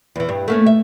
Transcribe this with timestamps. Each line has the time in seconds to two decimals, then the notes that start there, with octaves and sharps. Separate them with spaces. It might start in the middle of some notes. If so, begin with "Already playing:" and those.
0.16 E2 E3
0.29 G2
0.48 A3 A#3 C#4
0.66 E5